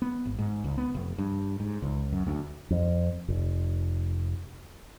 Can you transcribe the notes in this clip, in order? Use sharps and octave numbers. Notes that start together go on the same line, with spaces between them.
B3
G#1
G#2
C#2
B3
F1
G2
G#2
C#2
F#2
D2
F2
F1